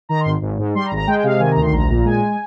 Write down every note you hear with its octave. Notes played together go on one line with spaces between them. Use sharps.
D#3 A#5
C6
G#1
G#1
G#2
G3 C6
A#5
G#1
A#5
G#3 G5
G5
C3 F5
D#3 G#5
A#5
D2
C6
A#1 A#5
A#2
G#3 G#5